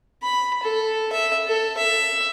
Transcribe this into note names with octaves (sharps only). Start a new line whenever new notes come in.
B5
A4
E5
A4
E5